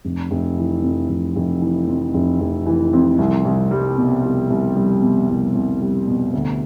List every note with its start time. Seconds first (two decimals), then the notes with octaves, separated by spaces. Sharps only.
0.05 F1
0.31 F1
0.58 E3
0.83 F2
1.09 F1
1.36 F1
1.61 E3
1.88 F2
2.14 F1
2.40 F1
2.66 E3
2.93 F2
3.18 C2
3.45 C2
3.71 G3
3.98 B2
4.24 C2
4.50 C2
4.76 G3
5.02 B2
5.29 C2
5.55 C2
5.81 G3
6.08 B2
6.33 D2